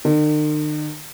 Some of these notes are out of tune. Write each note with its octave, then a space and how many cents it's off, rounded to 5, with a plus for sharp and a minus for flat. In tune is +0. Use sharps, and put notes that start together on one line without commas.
D#3 -45